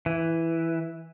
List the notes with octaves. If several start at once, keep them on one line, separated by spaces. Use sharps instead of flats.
E3